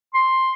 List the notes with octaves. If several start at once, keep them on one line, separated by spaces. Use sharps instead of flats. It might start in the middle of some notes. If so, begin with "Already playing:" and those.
C6